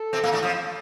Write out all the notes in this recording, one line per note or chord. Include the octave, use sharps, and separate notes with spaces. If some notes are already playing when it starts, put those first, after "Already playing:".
Already playing: A4
C3 C4
A#2 A#3
A2 A3
F2 F3